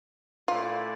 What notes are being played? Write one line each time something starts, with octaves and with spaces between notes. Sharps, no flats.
A#2 A3 E4 F4 A4 D5